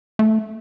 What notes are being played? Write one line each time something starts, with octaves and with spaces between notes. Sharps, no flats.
A3